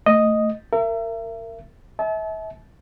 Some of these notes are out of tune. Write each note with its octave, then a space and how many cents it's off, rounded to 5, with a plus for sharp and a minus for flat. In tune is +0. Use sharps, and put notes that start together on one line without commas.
A3 +15 D#5 +0
A#4 -25 E5 +35
E5 -35 A5 -40